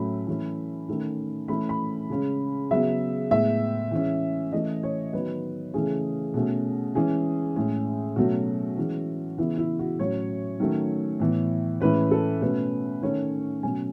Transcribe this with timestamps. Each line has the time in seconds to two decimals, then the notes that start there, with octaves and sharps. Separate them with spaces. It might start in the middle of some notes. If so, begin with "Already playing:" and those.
Already playing: A2 F#3 A3 C#4 B5
0.27 E3 A3 C#4
0.89 D#3 A3 C#4
1.48 E3 A3 C#4 B5
1.69 B5
2.10 C#3 G#3 C#4
2.71 C#3 F#3 B3 E5
3.31 A2 G#3 B3 E5
3.91 E3 G#3 C#4
4.52 E3 A3 C#4 D#5
4.83 C#5
5.13 D#3 F#3 B3 B4
5.74 C#3 E3 A3 C#4 G#4
6.34 B2 A3 C#4
6.95 E3 G#3 C#4 G#4
7.56 A2 G#3 C#4
8.16 B2 F#3 A3 C#4 F#4
8.77 E3 G#3 C#4
9.38 C#3 E3 B3 E4
9.58 E4
9.79 F#4
9.99 A2 F#3 C#4 C#5
10.60 D#3 F#3 A3 C#4
11.20 A2 E3 B3
11.81 A2 E3 G#3 C#4 B4
12.11 A4
12.41 B2 A3 C#4 B4
13.02 D#3 A3 C#4 C#5
13.63 B2 F#3 A3 C#4 G#5